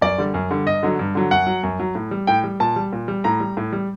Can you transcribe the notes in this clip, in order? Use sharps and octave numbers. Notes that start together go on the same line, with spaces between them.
F#2 D5
D3 G3
F#2
D3 G3
G2 D#5
D3 F#3
G2
D3 F#3
F#2 F#5
F#3
F#2
F#3
A2
G3
A2 G5
G3
A#2 A5
G3
A#2
G3
A2 A#5
G3
A2
G3